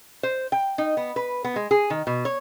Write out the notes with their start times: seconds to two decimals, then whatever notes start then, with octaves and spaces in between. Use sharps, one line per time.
0.23 C5
0.52 G5
0.78 D#4
0.97 B3
1.16 B4
1.44 B3
1.56 G#3
1.71 G#4
1.90 D#3
2.07 B2
2.25 C#5